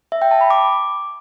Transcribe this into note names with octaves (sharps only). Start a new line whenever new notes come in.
E5
G5
A5
B5
D6